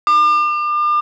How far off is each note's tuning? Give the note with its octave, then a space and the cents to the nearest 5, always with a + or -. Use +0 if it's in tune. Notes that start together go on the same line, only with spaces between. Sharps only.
D6 +40